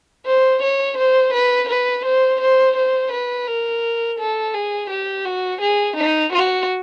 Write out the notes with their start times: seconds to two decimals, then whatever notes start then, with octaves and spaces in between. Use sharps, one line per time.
0.26 C5
0.62 C#5
0.98 C5
1.34 B4
1.69 B4
2.05 C5
2.41 C5
2.76 C5
3.12 B4
3.47 A#4
4.19 A4
4.54 G#4
4.90 G4
5.25 F#4
5.61 G#4
5.97 D#4
6.33 F#4